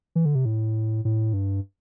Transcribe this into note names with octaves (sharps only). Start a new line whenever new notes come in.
E3
D3
C3
A2
A2
G2